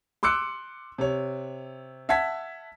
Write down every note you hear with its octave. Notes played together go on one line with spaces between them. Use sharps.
C6 D6 E6 F#6 C#7
C3 C#5
E5 F#5 A5 G#6 B6